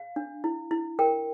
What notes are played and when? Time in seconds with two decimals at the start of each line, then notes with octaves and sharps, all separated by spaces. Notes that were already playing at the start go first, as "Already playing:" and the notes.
Already playing: F5
0.16 D4
0.44 E4
0.71 E4
0.99 A#4 G5